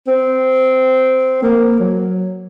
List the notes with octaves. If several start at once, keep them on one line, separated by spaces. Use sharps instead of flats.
C4
A#3
F#3